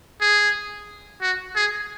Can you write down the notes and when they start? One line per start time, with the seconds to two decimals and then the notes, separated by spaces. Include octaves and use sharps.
0.21 G#4
1.21 F#4
1.55 G#4